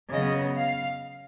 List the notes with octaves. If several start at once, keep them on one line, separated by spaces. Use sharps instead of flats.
C#3 F#3 B3 D#5
F5